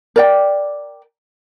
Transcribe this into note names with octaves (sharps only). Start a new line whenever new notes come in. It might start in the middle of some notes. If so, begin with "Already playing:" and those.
A#4 D5 G5